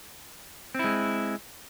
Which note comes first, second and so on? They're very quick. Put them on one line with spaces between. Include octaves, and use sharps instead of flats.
C4 E4 G#3